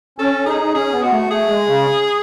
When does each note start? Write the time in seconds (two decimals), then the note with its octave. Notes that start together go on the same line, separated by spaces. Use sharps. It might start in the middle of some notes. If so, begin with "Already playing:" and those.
0.18 C#4 A4
0.46 D#4 G#4
0.74 C#4 G#4
0.92 B3
1.03 G#3 F#4
1.11 A3
1.30 A3 G#4
1.48 G#3
1.67 C#3